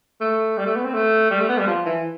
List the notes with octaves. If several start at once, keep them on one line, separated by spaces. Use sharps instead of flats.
A3
G3
A3
B3
C4
A3
G3
A3
B3
G3
F3
E3